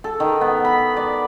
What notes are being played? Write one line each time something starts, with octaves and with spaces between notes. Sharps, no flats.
A4
D#3
B3
B5
D5